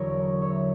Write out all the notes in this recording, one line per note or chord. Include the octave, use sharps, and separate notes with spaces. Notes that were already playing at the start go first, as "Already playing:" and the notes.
Already playing: E2 D3 F#3 A#4 C#5
C#5 E5